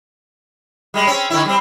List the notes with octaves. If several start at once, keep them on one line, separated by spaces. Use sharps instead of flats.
G3 G#3
C4 C#4
D3 D#3 E4
G3 C4